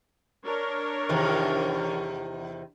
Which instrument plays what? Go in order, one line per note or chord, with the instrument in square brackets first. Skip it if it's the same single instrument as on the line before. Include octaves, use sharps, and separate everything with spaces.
[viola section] D4 A#4 C#5
[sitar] E2 C3 D#3